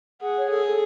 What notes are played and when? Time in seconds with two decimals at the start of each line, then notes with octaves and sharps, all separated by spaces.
0.21 G#4 F#5
0.36 C#5
0.50 G#4 A4
0.65 A4